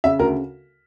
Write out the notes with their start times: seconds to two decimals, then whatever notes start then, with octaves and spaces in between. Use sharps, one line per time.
0.04 C#3 E5
0.19 D2 A#4